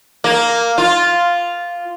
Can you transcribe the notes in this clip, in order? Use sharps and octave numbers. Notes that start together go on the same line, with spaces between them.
A#3
F4